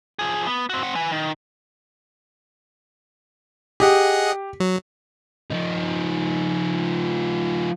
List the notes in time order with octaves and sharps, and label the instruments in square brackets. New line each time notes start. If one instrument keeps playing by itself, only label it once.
[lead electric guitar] F3 G#4
B3
C4 F#4
C4 F#5
B4 G#5
D#3
[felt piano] G4 [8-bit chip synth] G#4 D#5 F#5
[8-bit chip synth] F#3
[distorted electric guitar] F3 D#4